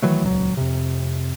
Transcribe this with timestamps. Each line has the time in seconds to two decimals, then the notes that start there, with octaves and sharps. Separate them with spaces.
0.02 D#3 E3 F#3 A3
0.23 D#1 C#2 F#3
0.57 F2 C3